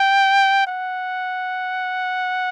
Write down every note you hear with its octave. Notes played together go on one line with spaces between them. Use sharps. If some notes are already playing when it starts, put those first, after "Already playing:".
Already playing: G5
F#5